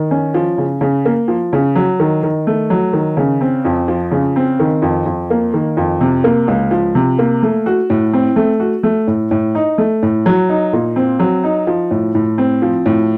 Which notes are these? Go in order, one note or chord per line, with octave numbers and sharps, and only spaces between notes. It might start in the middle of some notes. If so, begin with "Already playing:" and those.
Already playing: D#3
C#4
F3
C#3
C#3
A#3
F3
C#3
F#3
D#3
D#3
A3
F#3
D#3
C#3
C4
F2
F3
C#3
C4
D#3
F2
F2
A#3
D#3
F2
C3
A#3
C#2
F3
C3
A#3
A3
F#4
A2
C4
A3
F#4
A3
A2
A2
D#4
A3
A2
F#3
D#4
A#2
C4
F#3
D#4
F3
A2
A2
C4
F3
A2